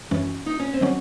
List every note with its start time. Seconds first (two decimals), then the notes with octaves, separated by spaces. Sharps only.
0.11 F#2 E3 G#3 C#4
0.46 D#4
0.60 C#4
0.74 C4
0.81 D#3 F#3 C#4